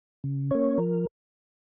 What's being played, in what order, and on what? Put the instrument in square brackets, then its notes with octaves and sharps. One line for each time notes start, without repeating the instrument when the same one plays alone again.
[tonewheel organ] C#3
A#3 C#4 C#5
F3 A#4